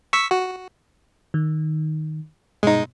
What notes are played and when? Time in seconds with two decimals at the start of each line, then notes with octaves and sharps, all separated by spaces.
0.13 C#6 E6 B6
0.31 F#4
1.34 D#3
2.63 G2 B2 G#3 D#4